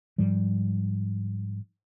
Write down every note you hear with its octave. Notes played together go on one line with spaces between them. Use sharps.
G#2 F3 G3